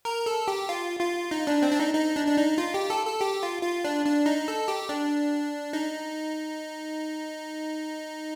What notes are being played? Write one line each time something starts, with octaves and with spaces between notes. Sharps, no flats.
A#4
A4
G4
F4
F4
D#4
D4
C4
D4
D#4
D#4
D4
D4
D#4
F4
G4
A4
A4
G4
F4
F4
D4
D4
D#4
A4
G4
D4
D#4